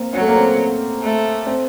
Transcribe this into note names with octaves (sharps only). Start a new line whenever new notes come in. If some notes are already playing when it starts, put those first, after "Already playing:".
Already playing: A#3 C4
F#3 C#4
A3
A#3
C4
A3
C4